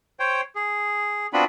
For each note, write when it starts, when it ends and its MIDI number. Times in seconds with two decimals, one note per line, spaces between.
0.20 0.41 72
0.20 0.41 73
0.20 0.41 79
0.55 1.27 68
1.33 1.44 59
1.33 1.44 60
1.33 1.44 62
1.33 1.44 65
1.33 1.44 66
1.33 1.44 83